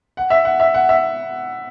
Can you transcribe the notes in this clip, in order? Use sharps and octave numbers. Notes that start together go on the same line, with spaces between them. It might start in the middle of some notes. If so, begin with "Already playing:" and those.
F#5
E5
F#5
E5
F#5
E5